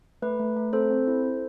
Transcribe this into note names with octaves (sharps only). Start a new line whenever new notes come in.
A3 B4
A3
A3
C4 A4 C5
C4
E4
A4